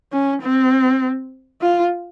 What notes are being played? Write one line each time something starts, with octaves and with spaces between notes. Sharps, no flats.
C#4
C4
F4